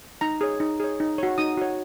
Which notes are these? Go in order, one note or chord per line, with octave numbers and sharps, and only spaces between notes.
D#4 A#5
G#4 C#5
D#4
G#4 C#5
D#4
F#4 C#5
D#4 D#6
F#4 C#5